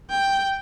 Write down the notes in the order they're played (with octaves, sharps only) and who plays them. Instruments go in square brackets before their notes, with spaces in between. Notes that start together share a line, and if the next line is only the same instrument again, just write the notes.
[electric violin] G5